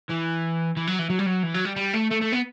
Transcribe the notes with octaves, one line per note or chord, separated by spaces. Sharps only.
E3
E3
F#3
E3
F#3
G3
F#3
E3
F#3
G3
G3
A3
A3
A3
B3